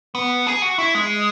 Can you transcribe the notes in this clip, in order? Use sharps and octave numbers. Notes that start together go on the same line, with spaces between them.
B3
G#4
F#4
E4
G#3